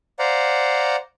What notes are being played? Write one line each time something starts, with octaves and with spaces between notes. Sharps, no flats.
C5 D5 F5 F#5 A#5